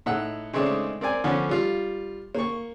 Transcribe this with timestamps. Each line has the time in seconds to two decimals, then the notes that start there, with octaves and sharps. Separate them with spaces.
0.06 A2 D#4 F#5 E6
0.53 C#3 G#3 A3 C4 D4 D#4
1.01 C4 A#4 D5 G#5
1.24 D3 F3 B3 C#4
1.49 G3 F4
2.35 A#3 C#6